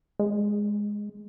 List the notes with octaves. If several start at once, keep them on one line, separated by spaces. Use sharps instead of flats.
G#3